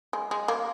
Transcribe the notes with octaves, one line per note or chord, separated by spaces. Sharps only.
G#3
G#3
A#3